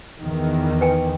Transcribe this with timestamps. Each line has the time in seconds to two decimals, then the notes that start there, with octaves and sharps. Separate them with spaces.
0.20 E2 D#3
0.81 B4 G5 G#5